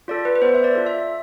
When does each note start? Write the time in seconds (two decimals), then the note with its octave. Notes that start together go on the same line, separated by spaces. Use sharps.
0.08 F4 A4 D5
0.25 B4
0.36 B4
0.42 B3 C5
0.54 E5
0.64 D5
0.75 F4 A4
0.86 E5